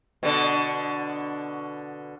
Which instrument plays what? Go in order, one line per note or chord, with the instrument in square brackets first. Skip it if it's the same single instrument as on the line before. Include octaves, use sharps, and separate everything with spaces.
[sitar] B2 D3